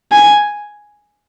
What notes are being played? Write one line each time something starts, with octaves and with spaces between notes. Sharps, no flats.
G#5